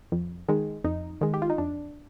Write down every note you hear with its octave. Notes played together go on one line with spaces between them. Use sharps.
F2
D#3 G#3
F2 D#4
D#3 G#3
G4
F4
D#4
F2 D4